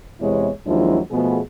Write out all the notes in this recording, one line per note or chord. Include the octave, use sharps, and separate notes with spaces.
E2 C3 G#3 B3 E4 C#5
D#2 F3 F#3 G#3 D4 E4
B2 F3 A3 B3 G#4